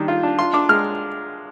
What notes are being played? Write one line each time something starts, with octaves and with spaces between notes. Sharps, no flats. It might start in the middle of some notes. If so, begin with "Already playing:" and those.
Already playing: D#3 G3 D4
F4
D4
F4 C6
D4 D6
G#3 F6